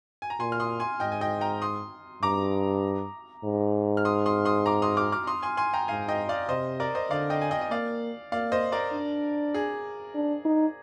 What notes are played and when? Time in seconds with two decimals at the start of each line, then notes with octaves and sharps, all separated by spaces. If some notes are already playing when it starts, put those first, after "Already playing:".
0.22 G#5
0.30 A#5
0.40 A#2 G#5 C6
0.52 F6
0.60 C6 D#6
0.80 G#5 C6
1.00 G#2 D#5 G5
1.12 G#5
1.21 D#5 G5
1.41 G5 A#5
1.62 C6 D#6
2.22 G2 A#5 D6
3.44 G#2
3.97 F6
4.05 C6 D#6
4.26 C6 D#6
4.45 C6 D#6
4.66 A#5 D6
4.82 C6 D#6
4.97 D6 F6
5.12 D6 F6
5.27 C6 D#6
5.43 G#5 C6
5.57 G#5 C6
5.73 G5 A#5
5.88 G#2 F5 G#5
6.08 D#5 G5
6.29 D5 F5
6.49 C3 C5 D#5
6.80 A#4 D5
6.95 C5 D#5
7.10 D3 D5 F5
7.30 D#5 G5
7.42 G#5
7.51 D#5 G5
7.61 D#5
7.70 A#3 D5 F5
8.32 A#3 D5 F5
8.52 C5 D#5
8.72 A#4 D5
8.92 D4
9.54 G#4
10.15 D4
10.45 D#4